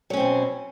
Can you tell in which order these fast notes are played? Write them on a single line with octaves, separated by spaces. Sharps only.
F#3 C#4 C4 B2